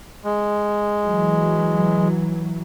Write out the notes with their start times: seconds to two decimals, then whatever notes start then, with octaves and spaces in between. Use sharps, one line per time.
0.24 G#3
1.04 E3 F#3